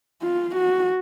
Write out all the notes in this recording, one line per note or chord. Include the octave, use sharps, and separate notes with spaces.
F4
F#4